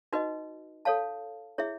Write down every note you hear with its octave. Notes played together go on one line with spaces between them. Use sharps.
D#4 F#4 B4 D#5
A4 C#5 F5 A5
E4 G#4 C#5 E5